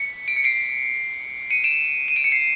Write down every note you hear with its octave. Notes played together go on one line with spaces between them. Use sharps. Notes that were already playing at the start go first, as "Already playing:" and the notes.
Already playing: B6 C#7
D7
C#7
C7 D7
C#7 D#7
D7 E7
D#7
D7
C#7
C7